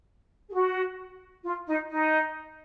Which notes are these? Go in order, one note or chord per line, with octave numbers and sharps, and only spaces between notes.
G#4
F#4
F4
D#4
D#4